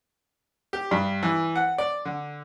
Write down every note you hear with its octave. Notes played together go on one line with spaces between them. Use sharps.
G4
G2
E3
F#5
D5
D3